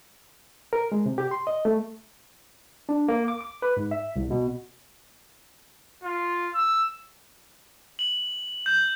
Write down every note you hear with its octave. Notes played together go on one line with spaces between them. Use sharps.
A#4
G#3
C3
G4
C6
D#5
A3
D4
A#3
D6
D6
B4
G#2
E5
C2
B2
F4
E6
F#7
G6